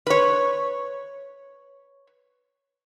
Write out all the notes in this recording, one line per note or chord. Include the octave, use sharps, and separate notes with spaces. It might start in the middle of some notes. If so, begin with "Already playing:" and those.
B4 C#5